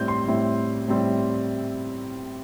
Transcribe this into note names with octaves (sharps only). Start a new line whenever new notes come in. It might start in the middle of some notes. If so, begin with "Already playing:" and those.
Already playing: A2 G3 C4 E4 G6
C6
A2 G3 C4 E4
A2 G3 C4 E4